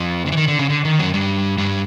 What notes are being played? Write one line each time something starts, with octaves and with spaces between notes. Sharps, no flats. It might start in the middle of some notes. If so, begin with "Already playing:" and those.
Already playing: F2 F3
D3
E3
D#3
D3
C#3
D3
D#3
F#2 F#3
G2 G3
G2 G3